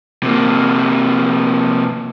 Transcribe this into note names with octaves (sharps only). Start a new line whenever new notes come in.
C3 A#3